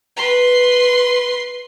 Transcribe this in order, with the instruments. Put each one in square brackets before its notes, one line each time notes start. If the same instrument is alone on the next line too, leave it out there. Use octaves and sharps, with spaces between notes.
[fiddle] B4 C6